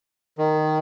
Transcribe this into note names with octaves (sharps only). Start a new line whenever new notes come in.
D#3